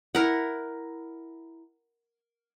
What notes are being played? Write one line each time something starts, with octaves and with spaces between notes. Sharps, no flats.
E4 A#4 F#5